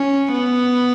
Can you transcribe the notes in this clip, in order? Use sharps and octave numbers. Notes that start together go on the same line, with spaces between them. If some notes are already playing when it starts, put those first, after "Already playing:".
Already playing: C#4
B3